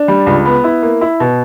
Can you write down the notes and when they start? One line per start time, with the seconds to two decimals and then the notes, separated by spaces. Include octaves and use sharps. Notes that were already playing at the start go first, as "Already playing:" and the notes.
Already playing: D4
0.08 G3
0.27 C#2
0.45 B3
0.64 E4
0.82 A#3
1.01 E4
1.20 B2